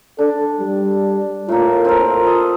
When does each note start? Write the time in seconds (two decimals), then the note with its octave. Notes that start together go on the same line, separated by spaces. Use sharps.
0.19 D4 A4
0.60 G3
1.49 A2 A#3 F4
1.85 C4 A4 A#4
2.23 D#5 A5